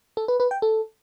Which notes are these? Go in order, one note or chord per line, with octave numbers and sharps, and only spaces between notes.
A4
B4
B4
G5
A4